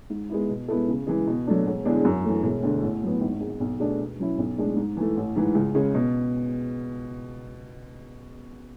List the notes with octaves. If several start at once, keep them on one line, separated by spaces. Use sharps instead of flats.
G#2
G#3 B3 E4
B2
G#3 B3 E4 A4
C#3
E3 G#3
B2
F#3 A3 D4
E1
E2 D3 G#3 D4
F#2
E3 A3
E1
D2 D3 A3
A1
A2 F#3 B3
G#1
G#2 G#3
B1
B2 A3 D4 G#4
B2
F#3 C#4 E4
B1
A2 G#3 D4
G#2
E3 A3
A1
G#2 E3
C#2
C#3 G#3 C#4
B2